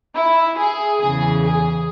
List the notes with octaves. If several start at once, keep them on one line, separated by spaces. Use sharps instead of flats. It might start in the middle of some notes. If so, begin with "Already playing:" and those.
E4
G#4
E2 C#3 E3 G#4
G#4